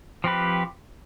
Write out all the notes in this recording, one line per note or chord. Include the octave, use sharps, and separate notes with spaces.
F3 C4 G4 B4